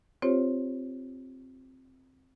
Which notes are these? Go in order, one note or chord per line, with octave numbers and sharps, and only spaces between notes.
C4 F4 G4 C5 C#5